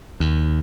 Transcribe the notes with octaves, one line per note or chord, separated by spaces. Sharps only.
D#2